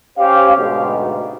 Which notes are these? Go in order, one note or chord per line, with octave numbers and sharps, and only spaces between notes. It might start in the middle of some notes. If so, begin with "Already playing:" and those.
C#4 G4 C5 F5
D2 G#2 B2